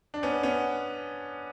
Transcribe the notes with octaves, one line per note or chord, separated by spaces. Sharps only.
D4
B3 C#4
B3 C#4